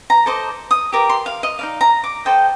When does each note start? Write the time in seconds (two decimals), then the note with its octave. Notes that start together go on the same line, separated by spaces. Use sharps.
0.10 A#5
0.26 A4 C5 D#5 D6
0.71 D#6
0.92 G4 A#4 D5 D6
1.09 C6
1.26 F5
1.43 D#5
1.59 D#4 A#4 D5 F5
1.81 A#5
2.04 D6
2.25 A4 C5 D#5 G5